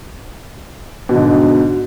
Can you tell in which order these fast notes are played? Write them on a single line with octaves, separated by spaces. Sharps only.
B2 D3 G#2